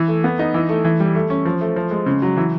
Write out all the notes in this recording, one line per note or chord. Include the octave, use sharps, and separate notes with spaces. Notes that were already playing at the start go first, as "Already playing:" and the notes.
Already playing: E3
A3
B3
D#4
E3
A3
E3
G3
A3
C#4
F3
A3
F3
G#3
C#3
F#3
E3